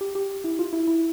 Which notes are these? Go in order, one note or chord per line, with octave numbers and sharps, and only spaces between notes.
G4
G4
E4
F4
E4
E4